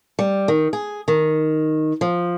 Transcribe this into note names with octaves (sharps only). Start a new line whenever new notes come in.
G3
D#3
G#4
D#3
F3